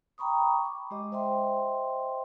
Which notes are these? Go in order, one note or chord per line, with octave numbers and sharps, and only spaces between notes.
G5 A#5 B5 C#6 D#6
D6
G#3 G4 D#5
C5 D#5 E5 G5 C6